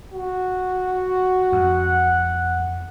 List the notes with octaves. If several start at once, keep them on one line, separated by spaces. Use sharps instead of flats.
F#4
F2 F#5